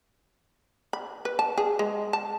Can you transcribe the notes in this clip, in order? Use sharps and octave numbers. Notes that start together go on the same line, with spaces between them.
B5
B4
A5
G#4
G#3
A5